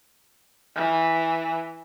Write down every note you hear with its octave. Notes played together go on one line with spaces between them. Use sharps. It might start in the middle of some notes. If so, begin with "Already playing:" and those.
E3